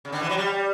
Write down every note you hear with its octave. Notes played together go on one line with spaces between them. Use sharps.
C#3
D3
E3
F#3
G3